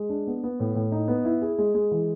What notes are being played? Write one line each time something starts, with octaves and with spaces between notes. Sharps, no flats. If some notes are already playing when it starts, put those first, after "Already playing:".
Already playing: G#3
D4
B3
B3
A2
A2
D#4
B3
E4
G#4
G#3
G#3
E3